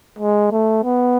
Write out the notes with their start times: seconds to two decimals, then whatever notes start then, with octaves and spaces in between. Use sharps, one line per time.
0.19 G#3
0.52 A3
0.84 B3